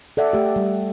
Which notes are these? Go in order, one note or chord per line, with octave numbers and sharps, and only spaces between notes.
A4 D5 E5 F#5
A3 G4
G3